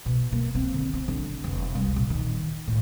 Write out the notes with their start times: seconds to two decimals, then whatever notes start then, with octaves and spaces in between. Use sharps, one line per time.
0.06 B2
0.32 A#3
0.55 C4
0.74 D3
0.94 C4
1.08 D3
1.44 F1
1.75 C2
1.96 A#1
2.10 D#3
2.67 A2